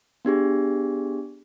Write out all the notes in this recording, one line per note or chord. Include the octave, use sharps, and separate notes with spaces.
B3 D4 G4 G#4